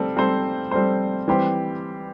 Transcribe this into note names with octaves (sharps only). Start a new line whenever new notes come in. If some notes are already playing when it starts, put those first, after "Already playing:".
Already playing: G3 C4 A4
G3 C4 A4 C5
G3 C4 A4 C5
E3 G3 C4 G4 C5